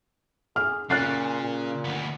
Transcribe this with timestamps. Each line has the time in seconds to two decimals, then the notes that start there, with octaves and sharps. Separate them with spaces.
0.56 G#4 F6
0.90 A#2 C#3 F#6 A6 C7
1.42 A#2
1.84 D2 B3